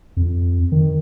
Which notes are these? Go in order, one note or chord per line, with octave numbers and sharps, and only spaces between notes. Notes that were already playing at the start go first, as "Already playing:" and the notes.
F2
D#3